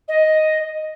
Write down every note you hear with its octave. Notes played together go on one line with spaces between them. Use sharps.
D#5